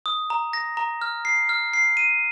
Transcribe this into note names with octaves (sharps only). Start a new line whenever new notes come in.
D#6
A#5
A#6
A#5
F6
C7
F6
C7
D#7